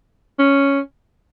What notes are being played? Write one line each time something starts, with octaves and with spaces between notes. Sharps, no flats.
C#4